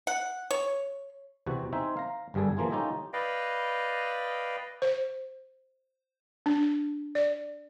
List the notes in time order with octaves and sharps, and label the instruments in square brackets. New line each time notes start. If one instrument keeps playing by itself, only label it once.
[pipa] F#5
C#5
[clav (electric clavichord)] E2 C3 C4 F#4 F#5
C4 D#4 C5 E5 G#5
F5 A#5
G1 G2 G3 G#4 A4
E3 F3 A#3 F4 G#4
C#4 D#4 F4 G4 A4 D#5
[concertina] B4 D5 D#5 F5 G5
[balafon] C5
D4
D5